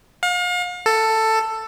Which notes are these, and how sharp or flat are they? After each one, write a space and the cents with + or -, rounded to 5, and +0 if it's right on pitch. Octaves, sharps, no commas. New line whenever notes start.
F5 +40
A4 +10